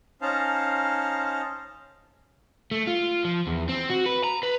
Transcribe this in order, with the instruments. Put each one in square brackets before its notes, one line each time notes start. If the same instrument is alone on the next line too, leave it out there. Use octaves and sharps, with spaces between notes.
[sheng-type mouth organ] C#4 D#4 C5 F5 A5 A#5
[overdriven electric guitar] A3
F4
F3
E2
C4
F#4
B4
A#5
B4